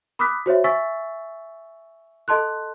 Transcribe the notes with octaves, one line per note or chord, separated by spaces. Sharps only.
B5 D6 D#6 F6 F#6 B6
F#4 C5 C#5 E5
E5 G#5 C#6 E6 A6 B6
A4 D#5 A5 C6 F#6